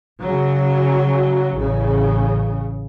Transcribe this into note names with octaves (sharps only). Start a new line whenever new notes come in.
C#3 F#3
A1 C#3